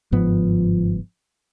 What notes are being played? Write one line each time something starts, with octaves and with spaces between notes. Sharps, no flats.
G1 G#2 F3 B3